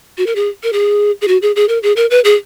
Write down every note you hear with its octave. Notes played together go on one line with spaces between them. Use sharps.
F#4
A#4
G#4
A#4
G#4
G#4
F#4
G#4
G#4
A#4
G#4
A#4
B4
G#4